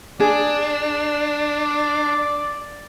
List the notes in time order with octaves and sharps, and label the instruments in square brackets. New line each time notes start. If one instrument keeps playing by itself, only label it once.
[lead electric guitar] D4 [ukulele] G#4 [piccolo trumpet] D5